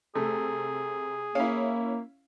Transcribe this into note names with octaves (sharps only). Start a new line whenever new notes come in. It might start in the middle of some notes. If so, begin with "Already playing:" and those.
C3 A3 G#4
A#3 C#4 E4 F5